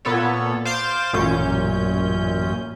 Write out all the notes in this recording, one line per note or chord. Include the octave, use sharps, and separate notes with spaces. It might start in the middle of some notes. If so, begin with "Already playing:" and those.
A#2 B3 A4 C#5
C5 F5 D6 G6 A6
A1 F#2 A#2 C#4 G6